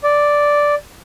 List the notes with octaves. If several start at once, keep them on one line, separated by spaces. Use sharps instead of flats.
D5